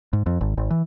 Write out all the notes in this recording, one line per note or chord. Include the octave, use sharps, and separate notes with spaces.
G#2
F2
G#1
G#1
E3